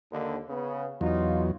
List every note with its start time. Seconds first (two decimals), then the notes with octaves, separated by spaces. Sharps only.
0.12 D#2 D3
0.49 C#3 B3
1.01 E2 F#3 D#4 F4